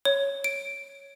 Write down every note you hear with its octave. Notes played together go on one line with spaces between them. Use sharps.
C#5
D7